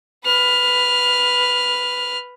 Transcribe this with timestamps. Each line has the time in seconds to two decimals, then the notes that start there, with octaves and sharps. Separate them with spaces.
0.25 B4 F6